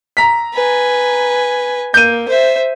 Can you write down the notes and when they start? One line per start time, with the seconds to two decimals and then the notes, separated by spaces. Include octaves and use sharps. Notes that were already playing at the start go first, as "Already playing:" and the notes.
0.17 A#5 B6
0.53 B4 G#5
1.94 A#3 G6 D#7
2.29 C5 E5